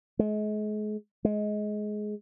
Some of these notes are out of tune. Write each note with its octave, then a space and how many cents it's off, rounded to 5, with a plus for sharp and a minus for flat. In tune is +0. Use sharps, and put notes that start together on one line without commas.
G#3 +35
G#3 +20